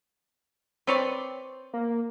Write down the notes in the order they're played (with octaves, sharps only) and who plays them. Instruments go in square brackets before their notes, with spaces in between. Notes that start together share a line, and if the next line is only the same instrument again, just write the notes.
[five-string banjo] C4 [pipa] B4 C#5 D5
[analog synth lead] A#3